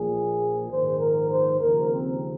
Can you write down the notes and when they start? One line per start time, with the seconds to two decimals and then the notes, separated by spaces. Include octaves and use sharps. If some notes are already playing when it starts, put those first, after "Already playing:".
Already playing: A#1 A#2 F3 G#4
0.70 A#1 G#2 D#3 C5
1.00 A#4
1.30 C5
1.60 D#2 C#3 F3 A#4
1.91 C4